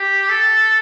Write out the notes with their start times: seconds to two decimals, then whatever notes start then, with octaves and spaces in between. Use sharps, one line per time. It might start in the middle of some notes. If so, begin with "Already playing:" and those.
Already playing: G4
0.30 A4